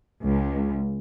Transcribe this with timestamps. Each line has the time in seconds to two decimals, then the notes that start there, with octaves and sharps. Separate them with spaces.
0.24 C#2